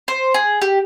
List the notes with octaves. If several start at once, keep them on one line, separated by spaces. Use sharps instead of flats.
C5
G#4
G4